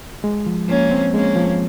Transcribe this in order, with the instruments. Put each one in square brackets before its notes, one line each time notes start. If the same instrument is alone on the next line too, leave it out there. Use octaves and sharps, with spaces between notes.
[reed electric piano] G#3
F3
[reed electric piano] F3 [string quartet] A#3 C#4
[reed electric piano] C4
[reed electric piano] G#3 [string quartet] A#3 C#4
[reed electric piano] F3